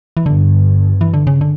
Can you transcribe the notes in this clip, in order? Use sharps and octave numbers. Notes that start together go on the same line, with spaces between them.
E3
G1 G2 D3
E3
D3
C#3
D3